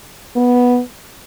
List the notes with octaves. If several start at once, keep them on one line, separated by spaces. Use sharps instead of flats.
B3